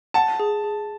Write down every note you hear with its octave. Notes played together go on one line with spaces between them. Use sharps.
F#5 A5
G#4
G#4